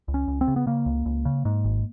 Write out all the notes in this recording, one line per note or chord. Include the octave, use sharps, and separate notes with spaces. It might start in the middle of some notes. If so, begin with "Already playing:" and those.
C#2
C#4
C#2
C4
C#3
B3
C#3 A#3
C#2
C#2
C#3
G#2
G#1